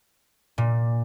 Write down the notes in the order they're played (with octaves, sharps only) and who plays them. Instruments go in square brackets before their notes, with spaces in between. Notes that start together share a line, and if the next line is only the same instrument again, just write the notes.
[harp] A#2